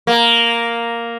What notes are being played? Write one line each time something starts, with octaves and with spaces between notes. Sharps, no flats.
A#3